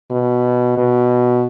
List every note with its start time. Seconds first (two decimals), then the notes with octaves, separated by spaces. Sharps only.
0.11 B2
0.77 B2